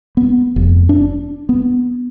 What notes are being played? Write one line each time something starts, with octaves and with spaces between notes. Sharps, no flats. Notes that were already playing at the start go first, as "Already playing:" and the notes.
B3
F1
D4
B3